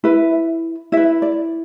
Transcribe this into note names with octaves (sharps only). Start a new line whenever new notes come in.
E4 B4 E5
E4 B4 E5
D5